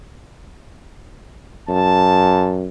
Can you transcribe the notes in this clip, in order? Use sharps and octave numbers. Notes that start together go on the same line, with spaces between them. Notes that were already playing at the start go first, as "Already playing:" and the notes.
F#2 A5